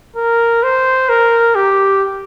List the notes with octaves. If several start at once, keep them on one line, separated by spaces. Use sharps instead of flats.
A#4
C5
A#4
G4